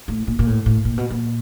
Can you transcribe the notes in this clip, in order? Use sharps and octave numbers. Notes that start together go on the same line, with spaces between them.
A2
A#2
A#2
A2
A2
A#2
B2
A#2